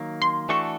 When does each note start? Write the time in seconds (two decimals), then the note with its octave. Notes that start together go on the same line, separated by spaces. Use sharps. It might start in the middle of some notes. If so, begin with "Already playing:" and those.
Already playing: D#3 F#3 A#3
0.22 C6
0.49 E3 A3 D4 F#4 A4 C#6